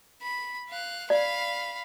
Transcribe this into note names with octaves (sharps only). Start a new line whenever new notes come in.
B5
F5 F#6
D5 F5 B5